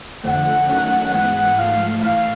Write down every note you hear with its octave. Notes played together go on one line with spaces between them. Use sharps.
F2 D3 F3 A3 F#5
D#3 F#3 A3 C#4 F#5
G#2 E3 G#3 B3 F#5
G#2 F3 A3 F5
A2 E3 A3 F5